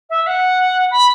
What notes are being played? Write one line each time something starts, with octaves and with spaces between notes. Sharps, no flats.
E5
F#5
B5